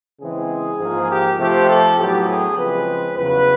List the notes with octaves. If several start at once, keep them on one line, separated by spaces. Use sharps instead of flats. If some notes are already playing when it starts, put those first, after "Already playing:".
C#3 E3 G#3 C4 G#4
G#2 F3 A#3
G4
C3 F3 A3 C4 G4
A4
A2 F#3 B3 G4
G#4
C#3 F3 G#3 C4 B4
E2 C#3 F#3 B4